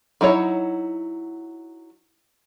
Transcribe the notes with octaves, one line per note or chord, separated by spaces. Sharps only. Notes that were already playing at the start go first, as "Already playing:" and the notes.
F#3 D#4 E4 C#5